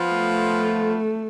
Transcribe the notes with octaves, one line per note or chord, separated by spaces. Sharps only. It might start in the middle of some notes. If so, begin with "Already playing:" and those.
Already playing: F3 B3 F4
A3